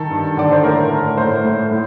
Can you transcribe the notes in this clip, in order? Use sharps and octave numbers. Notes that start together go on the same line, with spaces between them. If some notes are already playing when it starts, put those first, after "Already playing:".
Already playing: D#3 A4
G2
D3 D5
C5
A2 A#4
A2
A2 C5
A2
A2